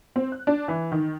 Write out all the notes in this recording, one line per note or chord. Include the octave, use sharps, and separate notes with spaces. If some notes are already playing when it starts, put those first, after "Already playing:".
C4
F#6
D4
E3
D#3